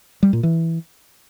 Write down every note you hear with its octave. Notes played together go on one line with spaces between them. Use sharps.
G3
A#2
E3